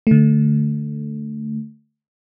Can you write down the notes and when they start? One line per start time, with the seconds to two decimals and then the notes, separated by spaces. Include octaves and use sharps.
0.07 D3 A3